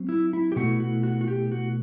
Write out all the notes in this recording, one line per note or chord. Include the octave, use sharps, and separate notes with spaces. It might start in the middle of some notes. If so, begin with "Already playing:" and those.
Already playing: F#3 C4
E4
E4
G4
B2 A3 E4 F#4
F#4
F#4
F#4
G4
F#4